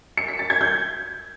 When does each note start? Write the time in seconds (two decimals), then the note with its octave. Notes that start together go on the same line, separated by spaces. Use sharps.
0.17 C#7
0.28 B6
0.39 A6
0.50 G#6
0.61 G6